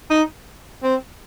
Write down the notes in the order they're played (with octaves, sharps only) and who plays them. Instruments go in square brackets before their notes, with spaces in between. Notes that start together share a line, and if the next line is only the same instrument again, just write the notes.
[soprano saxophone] D#4
C4